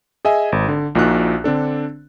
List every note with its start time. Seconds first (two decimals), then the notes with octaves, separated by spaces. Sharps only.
0.25 G#4 D#5 E5 G#5
0.52 G#1
0.69 D3
0.95 A#1 A#2 D#4 F#4 F#6
1.44 D3 C4 D4 A4